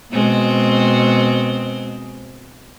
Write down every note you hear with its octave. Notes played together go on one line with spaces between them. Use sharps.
B2 G#3 C4